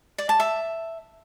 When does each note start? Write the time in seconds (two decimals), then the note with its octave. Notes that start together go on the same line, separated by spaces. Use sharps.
0.18 D5
0.29 A5
0.40 E5